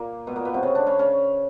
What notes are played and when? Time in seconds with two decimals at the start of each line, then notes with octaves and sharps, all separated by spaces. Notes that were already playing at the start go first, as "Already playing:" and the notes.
Already playing: A#2 A#3
0.27 B2 B3
0.36 A#2 A#3
0.45 B2 B3
0.54 C3 C4
0.63 C#3 C#4
0.75 D3 D4
0.86 C#3 C#4
0.99 C#3 C#4